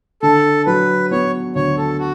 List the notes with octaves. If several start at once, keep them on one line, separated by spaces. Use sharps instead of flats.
D3 A4
F#3 B4
B3 C#5
D2 C#5
A4
F#4